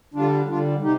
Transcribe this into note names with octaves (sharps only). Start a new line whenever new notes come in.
D3 G3 D4 F4
D3 G3 D4 F4
C3 D#4 G4